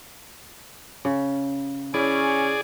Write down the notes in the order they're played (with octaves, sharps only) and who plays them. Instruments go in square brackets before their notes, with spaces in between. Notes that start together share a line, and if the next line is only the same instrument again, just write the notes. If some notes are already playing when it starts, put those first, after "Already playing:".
[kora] C#3
[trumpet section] C#4 [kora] E4 [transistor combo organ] G#4 D5